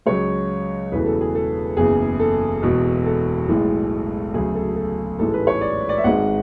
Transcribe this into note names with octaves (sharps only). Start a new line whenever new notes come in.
C#2 C#3 F#3 C#5
E1 E2 C#3 E3 A3 B4
A4
G#4
A4
F#1 E2 C#3 G#4
A4
E1 E2 B2
A4
B1 A2 E3 G#3
D2 C#3 F#3 G#4
A4
A4
A1 G#2 E3 G#3 A4
B4
C#5
D5
D5
E5
G#1 G#2 G#3 F#5